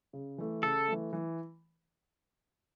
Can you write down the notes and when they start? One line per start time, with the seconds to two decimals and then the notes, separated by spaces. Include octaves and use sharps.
0.13 C#3
0.38 E3 A3
0.63 C#3 A4
0.88 E3 A3
1.13 E3